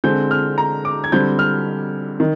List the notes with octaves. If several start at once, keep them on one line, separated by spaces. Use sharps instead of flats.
D3 G#3 C4 G6
F6
A#5
D6
G#6
D3 G3 C4 G6
F6
D#3